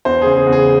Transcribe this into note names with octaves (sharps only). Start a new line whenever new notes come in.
E2 C5
C#3 G#4
G#4
E2
G#4